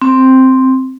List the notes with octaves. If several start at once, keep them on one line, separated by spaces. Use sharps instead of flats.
C4